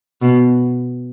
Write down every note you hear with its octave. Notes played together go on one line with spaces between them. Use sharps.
B2